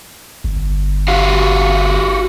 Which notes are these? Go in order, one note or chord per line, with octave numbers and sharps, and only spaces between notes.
G1
F#4 G4 F5